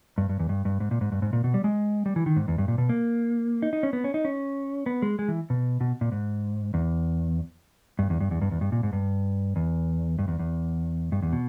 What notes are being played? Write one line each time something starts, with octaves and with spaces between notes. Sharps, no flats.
G2
G2
E2
G2
G2
G#2
A#2
G#2
G2
G#2
A#2
B2
G3
G#3
G3
E3
D#3
G#2
E2
G2
A#2
B2
A#3
D#4
D#4
C#4
B3
C#4
D#4
C#4
B3
G#3
G#3
E3
B2
B2
A#2
G#2
E2
G2
E2
G2
E2
G2
E2
G2
A#2
G#2
G2
E2
G2
E2
E2
G2
E2
B2